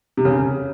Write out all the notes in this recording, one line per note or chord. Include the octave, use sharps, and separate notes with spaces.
C3
C#3